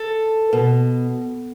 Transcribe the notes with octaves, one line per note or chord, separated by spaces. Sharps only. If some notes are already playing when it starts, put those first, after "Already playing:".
Already playing: A4
B2